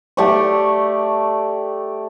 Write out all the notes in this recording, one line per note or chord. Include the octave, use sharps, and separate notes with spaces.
A3 G4 D5 C#6